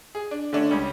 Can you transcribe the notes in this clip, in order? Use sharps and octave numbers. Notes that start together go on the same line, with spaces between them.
G#4
D4
D3 A3 C#4 D4
C#2 G3 C#4